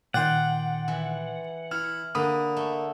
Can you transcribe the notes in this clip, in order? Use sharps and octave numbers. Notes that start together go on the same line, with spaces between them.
A#2 D#3 D5 F#5 G5 C6
E3
E4 F6
D3 A#3 B5 D#6
A3